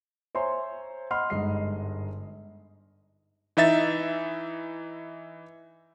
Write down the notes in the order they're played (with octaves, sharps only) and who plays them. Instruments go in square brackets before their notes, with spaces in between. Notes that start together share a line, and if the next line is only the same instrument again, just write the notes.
[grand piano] C5 C#5 E5 G#5 A#5 C6
D#5 F#5 B5 C6 F6
G1 G#2 D#5 C7
[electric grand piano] E3 D#4 E5 A6